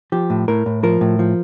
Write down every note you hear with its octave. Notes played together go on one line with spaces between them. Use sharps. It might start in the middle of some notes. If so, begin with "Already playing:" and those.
F3 G4
A2
A2 A#4
A2
F3 A#4
A2
F3